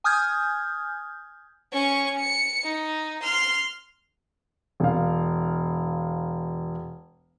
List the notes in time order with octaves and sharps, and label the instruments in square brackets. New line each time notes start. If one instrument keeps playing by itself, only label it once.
[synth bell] G#5 D#6 F6 G6 G#6
[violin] C#4 C#6
C#7
D#4
C6 F6
[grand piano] E1 F5